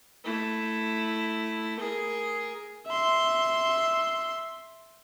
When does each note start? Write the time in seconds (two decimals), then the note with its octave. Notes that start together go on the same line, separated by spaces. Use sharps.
0.25 A3 E4
1.79 G#4 A#4
2.87 E5 C6